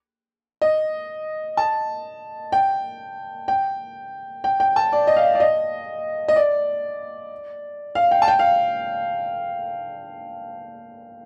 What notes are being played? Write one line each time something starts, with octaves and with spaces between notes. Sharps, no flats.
D#5
A5
G5
G5
G5
G5
A5
D5
D#5
F5
D5
D#5
D#5
D5
F5
G5
A5
G5
F5